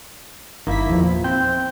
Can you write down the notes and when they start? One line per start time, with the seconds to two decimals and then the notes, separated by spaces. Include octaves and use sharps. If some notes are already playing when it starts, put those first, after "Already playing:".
0.67 G1 D#3 A#3 E4 B6
0.89 E2 A#2 F3
1.24 C4 G5